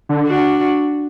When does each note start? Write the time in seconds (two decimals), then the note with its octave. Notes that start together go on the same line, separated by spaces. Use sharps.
0.09 D3
0.27 D4 F#4